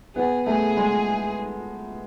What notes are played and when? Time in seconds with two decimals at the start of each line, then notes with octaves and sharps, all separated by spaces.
0.15 B3 G#4
0.46 A3 G#4
0.77 G#3